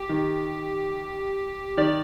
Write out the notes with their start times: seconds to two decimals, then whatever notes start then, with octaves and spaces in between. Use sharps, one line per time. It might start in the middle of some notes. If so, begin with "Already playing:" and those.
Already playing: G4
0.09 D#3
1.77 D#3 D5